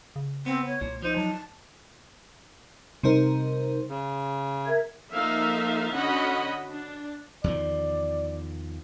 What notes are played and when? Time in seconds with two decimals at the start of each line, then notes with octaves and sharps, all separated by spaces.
0.16 C#3
0.46 B3 C4
0.67 C#5
0.81 C2 A#2
1.02 F3 D#4 C5
1.17 F#3 A5
3.03 C3 G3 D#4 A#4 C5
3.88 C#3
4.66 A#4 E5 G#6
5.13 F3 A#3 D#4 A4 E5 F5
5.95 D3 C#4 F#4 D#5 F#5 B5
6.70 D4
7.44 E2 D#3 F3 D5